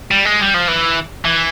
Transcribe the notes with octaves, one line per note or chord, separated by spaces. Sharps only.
G3
G#3
G3
F3
E3
E3